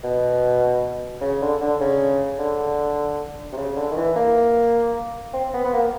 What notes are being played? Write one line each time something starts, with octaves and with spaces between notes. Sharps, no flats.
B2
C#3
D3
D3
C#3
D3
C3
C#3
D3
D#3
E3
A#3
C4
B3
B3
A#3